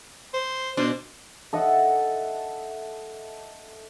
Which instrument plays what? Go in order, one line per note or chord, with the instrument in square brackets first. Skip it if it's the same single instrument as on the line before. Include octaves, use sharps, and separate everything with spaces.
[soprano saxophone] C5
[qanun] B2 D4 [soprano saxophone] C5
[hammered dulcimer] A4 D#5 E5 F#5